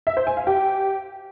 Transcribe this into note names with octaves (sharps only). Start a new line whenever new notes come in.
E5
C5
G#5
F5
G4